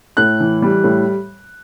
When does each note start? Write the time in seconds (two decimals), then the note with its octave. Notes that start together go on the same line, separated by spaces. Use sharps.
0.17 A2 F#6
0.40 E3
0.62 G3
0.84 A2